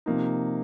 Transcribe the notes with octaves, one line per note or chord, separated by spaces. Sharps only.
C3 F3 A#3 D#4